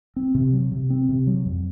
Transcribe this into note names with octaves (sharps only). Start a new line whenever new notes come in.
C4
C3
F#3
C3
C4
C3
F#3
F2